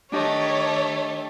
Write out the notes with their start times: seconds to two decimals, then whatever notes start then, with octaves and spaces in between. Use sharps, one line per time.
0.12 D#3 G3 A3 D4 G4 C#5 D#5